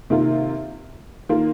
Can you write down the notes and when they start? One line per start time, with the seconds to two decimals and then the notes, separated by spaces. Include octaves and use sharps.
0.10 C3 D#3 A#3 F4
1.29 D#3 A#3 F4